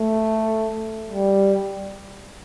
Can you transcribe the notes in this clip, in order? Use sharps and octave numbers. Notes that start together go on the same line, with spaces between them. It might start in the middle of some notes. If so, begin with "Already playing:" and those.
Already playing: A3
G3